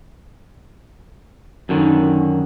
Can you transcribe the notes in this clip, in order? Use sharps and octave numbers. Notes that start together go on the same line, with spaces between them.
F#2 D3 D#3